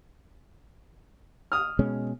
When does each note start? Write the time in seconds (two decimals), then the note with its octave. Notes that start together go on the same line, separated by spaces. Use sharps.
1.52 D#6 F6
1.79 B2 G#3 C#4